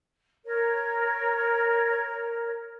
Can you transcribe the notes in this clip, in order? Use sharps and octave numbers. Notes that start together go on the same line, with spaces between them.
A#4 C#5